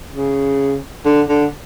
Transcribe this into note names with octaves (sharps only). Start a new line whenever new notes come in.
C#3
D3
D3